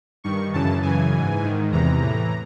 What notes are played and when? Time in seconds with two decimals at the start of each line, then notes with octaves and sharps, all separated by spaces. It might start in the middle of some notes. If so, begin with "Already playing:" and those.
0.24 G2 D#3 C#6
0.54 F#2 C#3 E3 A5
0.82 F#2 C#3 E3 G#5
1.13 G#2 E3
1.42 G#2 D#3
1.72 E2 C3 E3 A#5
2.01 A2 E3